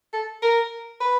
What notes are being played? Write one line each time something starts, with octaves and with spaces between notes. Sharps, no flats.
A4
A#4
B4